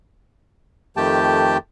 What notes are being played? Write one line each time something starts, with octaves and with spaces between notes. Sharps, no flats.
F2 D#3 A3 G4 G5 A5